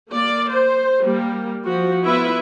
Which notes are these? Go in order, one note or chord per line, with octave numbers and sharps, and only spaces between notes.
A#3 D5
C5
G3 A#3
F3 F#4
B3 E4 F4 B4 E5